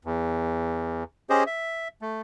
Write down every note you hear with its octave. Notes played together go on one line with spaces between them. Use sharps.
E2
C#4 G4 G#4 C5 D#5
E5
A3